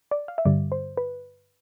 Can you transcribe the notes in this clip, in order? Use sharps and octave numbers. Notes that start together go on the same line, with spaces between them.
D5
F5
E5
G2 D3 G3 D5
C5
B4